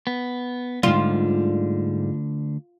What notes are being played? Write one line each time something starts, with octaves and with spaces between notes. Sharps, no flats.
B3
D2 G#2 D3 G3 F4